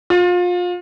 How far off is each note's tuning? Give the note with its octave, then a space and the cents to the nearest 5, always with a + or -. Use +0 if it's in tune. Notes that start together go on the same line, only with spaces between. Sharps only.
F4 +30